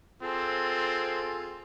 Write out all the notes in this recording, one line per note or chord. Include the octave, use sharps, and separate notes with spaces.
C4 F4 G#4 A4